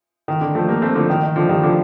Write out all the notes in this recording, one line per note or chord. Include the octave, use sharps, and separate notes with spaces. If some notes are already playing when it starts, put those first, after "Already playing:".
D#3
D3
F3 A3
G3 A#3
A3 C4
D3 F3
D#3
D#3
D3 F3
D#3 G3
D3 F3